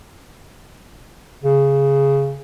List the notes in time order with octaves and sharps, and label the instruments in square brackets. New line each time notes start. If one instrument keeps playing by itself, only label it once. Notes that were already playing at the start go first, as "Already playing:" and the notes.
[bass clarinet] C#3